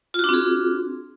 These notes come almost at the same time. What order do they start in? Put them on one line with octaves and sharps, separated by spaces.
F4 F#4 D4 C4 G#4